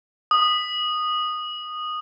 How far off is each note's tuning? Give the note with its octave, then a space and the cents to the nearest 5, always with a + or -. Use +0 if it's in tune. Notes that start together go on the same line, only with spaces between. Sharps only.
D#6 -10